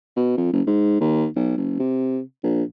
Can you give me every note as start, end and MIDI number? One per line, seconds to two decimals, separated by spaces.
0.17 0.36 47
0.37 0.52 41
0.53 0.62 30
0.67 1.00 44
1.01 1.27 39
1.36 1.54 35
1.58 1.76 30
1.80 2.20 48
2.43 2.63 34